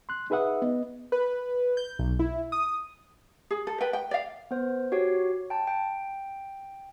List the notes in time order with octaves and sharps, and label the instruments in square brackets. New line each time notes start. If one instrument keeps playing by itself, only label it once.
[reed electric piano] C6 F#6
D#4 G#4 B4 E5 F#5 D#6
B3 D#5
[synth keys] B4
G6
B1
E4
D#6
[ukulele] G#4
A4
B4 G5
G5
D5 F5
[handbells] B3 C5
F#4 G4 C#5
G5 A5
G5